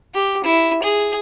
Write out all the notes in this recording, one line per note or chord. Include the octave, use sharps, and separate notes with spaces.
G4
E4
G#4